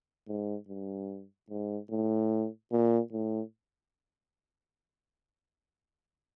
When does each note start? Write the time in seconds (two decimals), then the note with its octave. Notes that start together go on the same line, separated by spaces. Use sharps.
0.28 G#2
0.68 G2
1.50 G#2
1.90 A2
2.72 A#2
3.12 A2